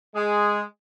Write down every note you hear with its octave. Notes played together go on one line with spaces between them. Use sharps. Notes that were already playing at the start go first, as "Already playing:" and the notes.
G#3 G#4